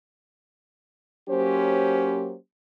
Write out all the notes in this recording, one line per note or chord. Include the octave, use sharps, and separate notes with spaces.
F#3 A#3 C#4 G4 C5